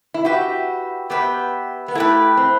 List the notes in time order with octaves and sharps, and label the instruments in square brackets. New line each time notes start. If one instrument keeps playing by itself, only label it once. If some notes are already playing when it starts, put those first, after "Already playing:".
[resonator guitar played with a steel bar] E4
[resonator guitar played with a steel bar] F#4 [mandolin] G4 B4 E5 G5
[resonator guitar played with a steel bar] B3 [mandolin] G4 B4 E5 G5
[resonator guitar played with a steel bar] B3
[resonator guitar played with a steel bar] A3 [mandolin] E4 G4 B4
[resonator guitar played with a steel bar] C4